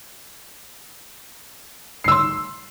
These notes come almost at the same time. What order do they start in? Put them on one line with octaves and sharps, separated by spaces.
C7 E6 C6